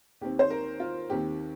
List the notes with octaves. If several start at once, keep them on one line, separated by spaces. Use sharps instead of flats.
D#2 D#3 C4 G4
C5
A#4
F4
D#2 D#3 C4 G4